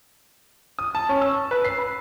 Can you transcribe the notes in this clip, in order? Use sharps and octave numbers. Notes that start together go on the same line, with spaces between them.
D#6
A5
C#4
E6
B4
C7
B5